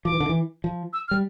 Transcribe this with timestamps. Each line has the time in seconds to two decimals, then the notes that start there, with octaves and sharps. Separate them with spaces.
0.05 F3 D6
0.12 E3
0.20 D3
0.29 E3
0.64 F3
0.93 E6
1.08 F6
1.11 G3